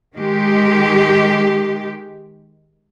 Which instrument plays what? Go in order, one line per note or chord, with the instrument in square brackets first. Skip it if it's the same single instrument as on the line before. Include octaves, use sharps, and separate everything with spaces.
[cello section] D#3 G#3 G4